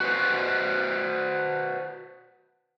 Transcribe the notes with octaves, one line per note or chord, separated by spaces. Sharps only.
F#4 B4 C5